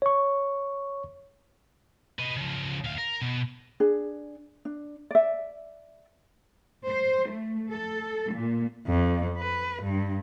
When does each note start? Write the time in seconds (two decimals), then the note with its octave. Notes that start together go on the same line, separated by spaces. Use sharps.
0.02 C#5 C#6
2.19 B4 D#5
2.36 C#3 F3
2.84 D2 F5
2.98 A#4
3.21 B2
3.80 D4 G#4
4.65 D4
5.11 D5 E5
6.89 C5
7.30 A3
7.71 A4
8.33 A#2
8.87 F2
9.37 B4
9.83 G2